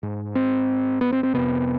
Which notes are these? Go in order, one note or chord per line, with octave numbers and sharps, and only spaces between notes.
G#2
C4
B3
C4
C4
F2 C3 B3